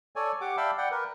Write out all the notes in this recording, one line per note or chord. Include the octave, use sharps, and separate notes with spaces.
A4 C#5 D5 G#5
G4 F#5 D6
D5 E5 F5 G5 A5 B5
D5 F#5 G5
A#4 B4